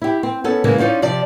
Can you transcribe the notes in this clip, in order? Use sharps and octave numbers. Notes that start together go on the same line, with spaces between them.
E4 G4
C4
B3 C#4 A4
C#3 E3 G#3 A#3
C#4 D#4 F4 C5 D5
C3 F3 D5 A5